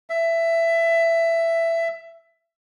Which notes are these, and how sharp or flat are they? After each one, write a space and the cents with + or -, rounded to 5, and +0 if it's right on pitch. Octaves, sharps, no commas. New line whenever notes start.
E5 +15